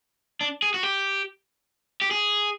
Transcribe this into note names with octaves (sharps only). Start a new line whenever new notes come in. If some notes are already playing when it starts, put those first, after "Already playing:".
D4
G#4
F#4
G4
G4
G#4